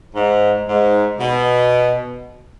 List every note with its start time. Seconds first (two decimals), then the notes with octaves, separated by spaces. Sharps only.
0.15 G#2
0.67 G#2
1.19 B2